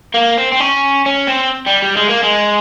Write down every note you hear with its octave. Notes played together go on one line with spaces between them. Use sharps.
A#3
C4
C4
C#4
C#4
C4
G3
G3
G#3
A#3
G#3